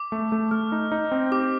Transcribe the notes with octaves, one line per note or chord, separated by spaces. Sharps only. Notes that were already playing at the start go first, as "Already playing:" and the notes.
Already playing: D6
A3
A3
A3 F6
D#4
D#4
C4
G4 D6